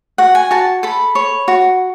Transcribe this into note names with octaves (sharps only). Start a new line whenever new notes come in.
F#4 F#5
G#5
F#4 A5
A4 B5
C#5
F#4